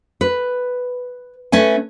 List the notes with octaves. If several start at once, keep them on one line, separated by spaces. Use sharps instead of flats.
B4
A3 C#4 B4 G#5